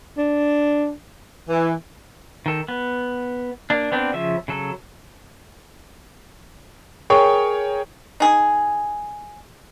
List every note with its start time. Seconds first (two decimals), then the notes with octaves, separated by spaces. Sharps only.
0.18 D4
1.49 E3
2.46 D#3 A4
2.68 B3
3.70 A#3 D4
3.92 B3 C4 D4
4.13 C#3 F3 E5
4.48 C#3 F#3 A4
7.10 G#4 A#4 C#5 G5 C#6
8.20 D#4 G#4